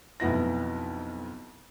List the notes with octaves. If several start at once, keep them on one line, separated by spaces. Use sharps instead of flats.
B1 F2 B3 E4 A#6